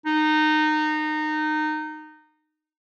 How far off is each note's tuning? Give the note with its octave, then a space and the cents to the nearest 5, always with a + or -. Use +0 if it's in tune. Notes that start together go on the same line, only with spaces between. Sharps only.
D#4 -20